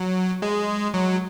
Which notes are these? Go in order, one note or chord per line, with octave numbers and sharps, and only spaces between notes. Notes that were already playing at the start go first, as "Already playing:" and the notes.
Already playing: F#3
G#3
F#3